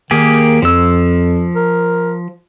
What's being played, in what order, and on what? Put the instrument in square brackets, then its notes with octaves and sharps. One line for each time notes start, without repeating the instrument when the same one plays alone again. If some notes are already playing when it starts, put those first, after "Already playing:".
[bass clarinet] D#3 [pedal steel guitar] A#3 G4 G#4
[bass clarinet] F2 [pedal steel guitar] F3 E6
[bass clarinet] A#4